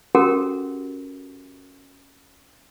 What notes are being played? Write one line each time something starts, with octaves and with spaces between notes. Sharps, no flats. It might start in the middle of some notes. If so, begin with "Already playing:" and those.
C#4 F#4 G4 A4 A#4 F#5